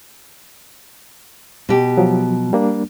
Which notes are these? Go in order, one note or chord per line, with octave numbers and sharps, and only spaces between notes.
B2 G4
F3 F#3
G3 A#3 D4